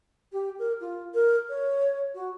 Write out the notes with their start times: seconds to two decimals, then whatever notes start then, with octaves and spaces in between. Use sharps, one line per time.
0.33 G4
0.59 A#4
0.80 F4
1.14 A#4
1.49 C#5
2.15 F#4